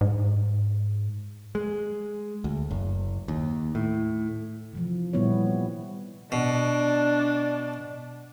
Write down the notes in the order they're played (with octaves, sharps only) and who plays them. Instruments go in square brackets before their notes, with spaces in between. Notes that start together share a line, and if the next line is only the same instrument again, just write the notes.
[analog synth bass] G#2
[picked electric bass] G#3
D2
F#1
D#2
A2
[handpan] C3 E3 F3
A#2 D#3 G3 B3 E4 C#5
[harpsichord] B2 [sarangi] D4